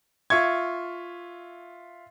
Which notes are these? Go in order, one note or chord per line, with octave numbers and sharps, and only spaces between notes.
F4 E5 C#6 G#6